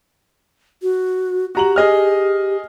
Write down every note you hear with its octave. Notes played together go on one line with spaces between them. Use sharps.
F#4
F#4 G4 A#5 F#7
G#4 D#5 F6